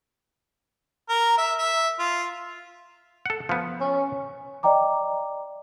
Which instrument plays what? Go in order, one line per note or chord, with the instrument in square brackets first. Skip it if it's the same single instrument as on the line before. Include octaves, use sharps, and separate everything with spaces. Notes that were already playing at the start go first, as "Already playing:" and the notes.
[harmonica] A#4
E5
E5
F4
[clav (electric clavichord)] A4 F#5
F3 B3
[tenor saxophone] C#4
[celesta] D5 D#5 G5 A#5 D6